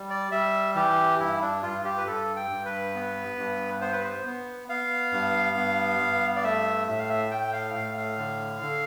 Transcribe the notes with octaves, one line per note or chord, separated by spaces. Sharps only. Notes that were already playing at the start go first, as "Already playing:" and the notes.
Already playing: G3
D5
G3 E5
E3 G4
G2 E4
D4
G2 F4
G4
B4
G2 A4
G5
G2
B4
B3
G2
B3 C5
B4
C5
B3
B3 F5
G2
B3
G2
D5
A3 E5
A2 E5
F5
E5
A3 G5
F5
A2 F5
F5
D3
D3